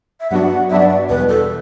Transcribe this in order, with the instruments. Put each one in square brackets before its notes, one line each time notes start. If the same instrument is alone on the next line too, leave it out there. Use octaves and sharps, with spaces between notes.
[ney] E5
[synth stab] G2 F#3 B3 D4 F#4 [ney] F#5
[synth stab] G2 F#3 B3 D4 F#4 [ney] E5
[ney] D5
D5
[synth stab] E2 B2 G3 [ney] B4
[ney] A4